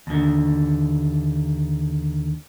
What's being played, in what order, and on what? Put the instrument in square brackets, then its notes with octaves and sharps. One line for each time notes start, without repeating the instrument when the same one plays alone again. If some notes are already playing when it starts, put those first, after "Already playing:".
[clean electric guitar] D#2 D3